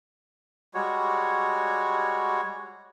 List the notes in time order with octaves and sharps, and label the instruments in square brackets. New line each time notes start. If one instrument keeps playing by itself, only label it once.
[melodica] G3 G#3 F#4 C#5